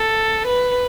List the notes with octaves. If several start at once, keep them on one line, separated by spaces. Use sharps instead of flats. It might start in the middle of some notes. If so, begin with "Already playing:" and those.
Already playing: A4
B4